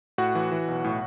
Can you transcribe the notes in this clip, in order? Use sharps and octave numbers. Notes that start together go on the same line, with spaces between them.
A2 F#4 F#5
E3
E3
B1
A2